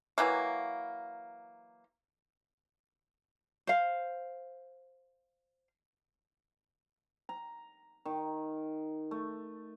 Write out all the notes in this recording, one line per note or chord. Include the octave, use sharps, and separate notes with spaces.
E3 F#3 A#3
C5 F5
A#5
D#3
A3